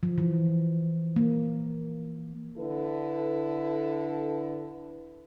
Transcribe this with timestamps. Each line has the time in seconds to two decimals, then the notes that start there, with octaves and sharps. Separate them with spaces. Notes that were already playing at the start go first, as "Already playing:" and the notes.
0.03 F3
0.18 E3
1.16 A#3
2.57 D3 E4 A4 B4